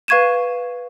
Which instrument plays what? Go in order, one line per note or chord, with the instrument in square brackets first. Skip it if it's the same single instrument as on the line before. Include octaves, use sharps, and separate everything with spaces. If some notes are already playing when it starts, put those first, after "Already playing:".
[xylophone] B4 F5 C#6 G#6 D#7 E7